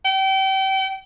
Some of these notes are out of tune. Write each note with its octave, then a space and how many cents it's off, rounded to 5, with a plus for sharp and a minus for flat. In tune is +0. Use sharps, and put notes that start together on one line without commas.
G5 -30